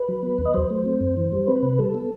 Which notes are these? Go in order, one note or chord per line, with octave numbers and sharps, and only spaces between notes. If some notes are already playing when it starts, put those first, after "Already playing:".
Already playing: B4
F#3
B3
D#2
D#5
F#3 C5
A3
C4
F#2
E3
G3
C4 B4
C3
G3 A4
B3